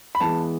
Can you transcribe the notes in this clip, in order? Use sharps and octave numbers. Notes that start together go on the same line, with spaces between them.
B5
E3 G#3 B3 A5